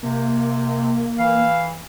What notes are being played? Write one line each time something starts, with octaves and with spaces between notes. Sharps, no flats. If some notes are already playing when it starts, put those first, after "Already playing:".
C3 A#3
E3 F5